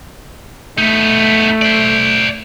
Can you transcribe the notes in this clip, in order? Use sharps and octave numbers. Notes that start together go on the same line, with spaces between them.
A3 B3 D#4
C5 D5